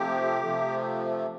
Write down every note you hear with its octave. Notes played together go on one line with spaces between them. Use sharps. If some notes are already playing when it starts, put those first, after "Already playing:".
Already playing: C3 F3 A3 G4
C3 F3 A3